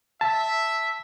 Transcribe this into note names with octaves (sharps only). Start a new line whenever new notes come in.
E5 A5